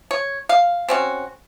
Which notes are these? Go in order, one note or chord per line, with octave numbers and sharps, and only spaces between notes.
C#5
F5
C4 C#4 F#4